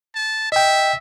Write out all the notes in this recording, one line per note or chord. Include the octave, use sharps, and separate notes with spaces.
A5
D#5 E5 G5